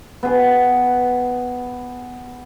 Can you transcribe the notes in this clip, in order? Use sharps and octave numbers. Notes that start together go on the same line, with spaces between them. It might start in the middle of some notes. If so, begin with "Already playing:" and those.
B3 G#4 G5